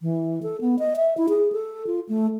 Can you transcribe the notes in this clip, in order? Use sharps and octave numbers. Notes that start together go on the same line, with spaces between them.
E3
A4
B3
D#5
E5
E4
G#4
A4
F4
A3